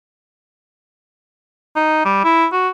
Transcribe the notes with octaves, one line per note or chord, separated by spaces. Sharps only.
D#4
G3
E4
F#4